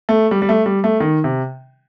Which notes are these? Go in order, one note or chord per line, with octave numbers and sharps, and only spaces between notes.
A3
G3
G3
A3
G3
A3
D#3
C3